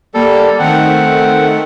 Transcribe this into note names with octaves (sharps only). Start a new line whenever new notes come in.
G3 A#3 A4
D#3 A3 C4 F#5